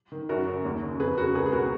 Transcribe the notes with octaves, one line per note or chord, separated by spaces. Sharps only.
D#3
F#2 F#4 A#4
C#3
D#2
C#3
F2 G#4 B4
C#3 F#4 A#4
C#2 G#4 B4
G#4
B2 F#4 A#4